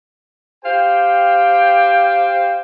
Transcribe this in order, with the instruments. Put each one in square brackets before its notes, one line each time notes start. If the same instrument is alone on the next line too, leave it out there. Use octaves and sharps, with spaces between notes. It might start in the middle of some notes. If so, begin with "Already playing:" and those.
[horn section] G4 C5 F5 G5